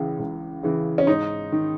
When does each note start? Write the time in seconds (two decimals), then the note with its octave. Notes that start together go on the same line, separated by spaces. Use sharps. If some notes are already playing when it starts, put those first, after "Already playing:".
Already playing: C#2 C#3 E3
0.19 C#2
0.63 C#3 E3
0.98 C#4
1.07 G#2 D#4
1.52 D#3